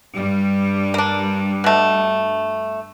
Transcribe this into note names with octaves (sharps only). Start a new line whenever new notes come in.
G2 G3
A#3 D4
B2 A3